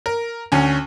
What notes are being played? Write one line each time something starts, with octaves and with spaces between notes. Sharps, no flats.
A#4
D2 C#4